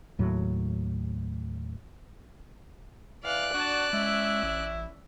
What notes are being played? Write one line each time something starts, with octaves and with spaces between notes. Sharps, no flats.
D#2 A2 F#3
E3 D5 F5 F#6
D4 F#4 A5
G#3 C#4 E4 E5
A1